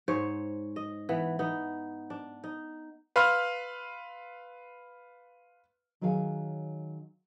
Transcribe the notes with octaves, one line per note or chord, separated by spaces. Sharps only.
G#2 C5 C#5
D#5
E3 B3
B3 D#4
D4
D#4
B4 F5 B5 C6 E6 F6
D#3 F#3 G#4 C#5 F5 G#5